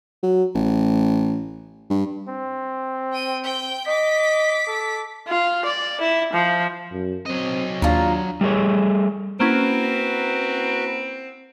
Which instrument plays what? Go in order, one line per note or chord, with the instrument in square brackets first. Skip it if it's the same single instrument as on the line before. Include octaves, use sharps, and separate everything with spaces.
[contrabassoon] F#3
A1
G2
[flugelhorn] C4
[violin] G5 D#7
G5 G6
[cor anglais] D#5 [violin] D6 B6
[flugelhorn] A4
[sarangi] F4
D5
E4
F3
[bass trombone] F#2
[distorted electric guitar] F#3 D#5 [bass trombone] C4
[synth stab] D#2 [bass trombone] D4 [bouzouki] F4 A#5
[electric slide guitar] G3 A3 G#4 C#5
[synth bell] A#3 C#4 E4 [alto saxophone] C4 [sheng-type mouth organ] F#4 A#4 B4